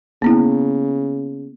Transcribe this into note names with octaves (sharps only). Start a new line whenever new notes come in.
C#3 A#3 B3 E4